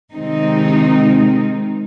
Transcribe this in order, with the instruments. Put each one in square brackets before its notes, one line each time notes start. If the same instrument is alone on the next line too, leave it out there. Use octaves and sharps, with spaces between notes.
[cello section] C3 D#3 G#3 C4 D#4